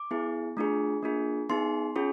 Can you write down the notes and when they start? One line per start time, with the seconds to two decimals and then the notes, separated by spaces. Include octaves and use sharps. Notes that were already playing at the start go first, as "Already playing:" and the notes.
Already playing: D6
0.11 B3 E4 G#4
0.57 A3 D4 F4 G#4
1.03 A#3 D4 F4 G#4
1.49 B3 D#4 G#4 C6
1.96 C#4 F4 G#4